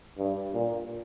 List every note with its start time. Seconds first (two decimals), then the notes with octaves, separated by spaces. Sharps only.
0.18 G2
0.54 A#2